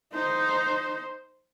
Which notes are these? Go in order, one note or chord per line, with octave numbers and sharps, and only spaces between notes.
D#4 C5